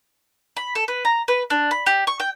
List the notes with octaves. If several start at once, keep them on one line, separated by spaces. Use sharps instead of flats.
B5
A4
B4
A#5
B4
D4
B5
G4
C#6
G5